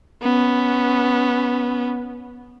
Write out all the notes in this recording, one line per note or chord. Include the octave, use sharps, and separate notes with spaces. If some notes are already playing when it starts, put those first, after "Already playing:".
B3 C#4